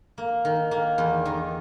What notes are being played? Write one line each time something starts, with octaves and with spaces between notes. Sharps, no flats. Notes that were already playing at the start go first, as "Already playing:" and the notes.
A#3
D#3
A#3
E2
D#3